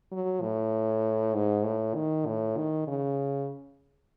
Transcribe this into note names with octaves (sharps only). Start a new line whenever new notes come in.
F#3
A2
G#2
A2
D#3
A2
D#3
C#3